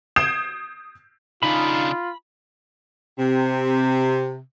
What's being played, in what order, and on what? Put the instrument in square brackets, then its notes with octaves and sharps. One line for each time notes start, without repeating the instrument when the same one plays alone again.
[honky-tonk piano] D#6 G6 G#6 C7 D7 E7
[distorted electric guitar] C#3 D4 [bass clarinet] D#4 [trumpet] F4 [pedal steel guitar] B5
[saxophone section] C3